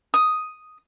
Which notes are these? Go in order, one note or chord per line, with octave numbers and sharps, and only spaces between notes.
D#6